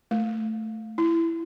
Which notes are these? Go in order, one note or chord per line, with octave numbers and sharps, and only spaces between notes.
A3
E4